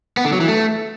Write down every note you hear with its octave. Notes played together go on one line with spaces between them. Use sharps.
B3
D3
F#3
E3
A3